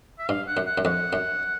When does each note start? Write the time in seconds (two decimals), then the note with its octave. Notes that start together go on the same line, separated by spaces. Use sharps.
0.19 E5
0.29 G2 F5
0.47 F#5
0.57 F#2
0.66 F#5
0.78 F#2
0.85 F2 F#5
1.13 F#2